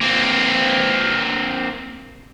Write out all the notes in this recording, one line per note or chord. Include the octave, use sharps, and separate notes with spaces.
A#3 C4